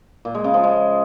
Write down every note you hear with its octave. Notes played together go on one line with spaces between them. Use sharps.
A#2
G#3
C#3
F3
G#3